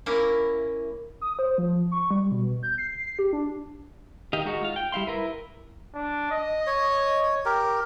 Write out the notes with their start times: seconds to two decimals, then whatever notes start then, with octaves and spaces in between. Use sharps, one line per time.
0.06 A#3 C#4 E4 A#4
1.21 D#6
1.39 C5
1.58 F3
1.92 C#6
2.11 G3
2.32 B2
2.63 G6
2.78 C7
3.19 G4
3.33 D4
4.33 D#3 G4 D#5 F5
4.45 G#3 D#4 F#4
4.63 F4 F5
4.76 G5
4.92 G3 E4 F5 C6
5.07 E4 A#4 B4
5.94 D4
6.32 D#5
6.67 C#5
7.45 G4 A#4